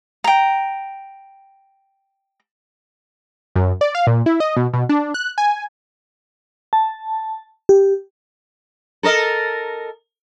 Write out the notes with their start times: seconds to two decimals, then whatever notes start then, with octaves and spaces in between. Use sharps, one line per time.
0.24 G5 A#5
3.56 F#2
3.81 D5
3.95 F5
4.07 A#2
4.26 E4
4.40 D#5
4.57 B2
4.73 B2
4.89 D4
5.14 F#6
5.38 G#5
6.73 A5
7.69 G4
9.03 A4 A#4 D#5